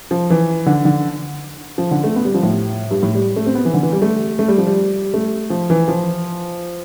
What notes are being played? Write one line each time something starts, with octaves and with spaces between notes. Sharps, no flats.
F3
E3
D3
D3
F3
D3
A3
B3
G3
F3
A2
G2
A2
G3
A3
C4
B3
E3
D3
E3
G3
A3
A3
G3
F3
G3
A3
F3
E3
F3